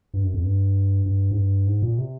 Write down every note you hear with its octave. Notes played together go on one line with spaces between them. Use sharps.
G2
F#2
F2
G2
G2
G#2
G2
G#2
A#2
C3